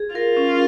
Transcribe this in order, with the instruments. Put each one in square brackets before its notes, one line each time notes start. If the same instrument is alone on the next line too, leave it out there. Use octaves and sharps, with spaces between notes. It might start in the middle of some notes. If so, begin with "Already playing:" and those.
Already playing: [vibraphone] G#4
[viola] F4 [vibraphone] A#4
[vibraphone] C#4